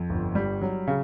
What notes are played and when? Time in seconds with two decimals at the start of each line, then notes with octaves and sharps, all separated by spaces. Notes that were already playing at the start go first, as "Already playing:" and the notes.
Already playing: F2
0.10 G1
0.35 G3
0.61 F#3
0.87 C#3